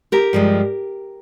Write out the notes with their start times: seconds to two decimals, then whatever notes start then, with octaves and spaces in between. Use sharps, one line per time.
0.12 G4 A#4
0.33 G2 F3 G#3